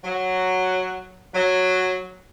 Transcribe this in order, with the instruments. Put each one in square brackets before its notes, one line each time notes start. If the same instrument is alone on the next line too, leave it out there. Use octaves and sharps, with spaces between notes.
[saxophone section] F#3
F#3